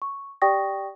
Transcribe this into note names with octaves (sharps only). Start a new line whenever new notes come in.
C#6
G4 D5 G5 C#6 D#6 A#6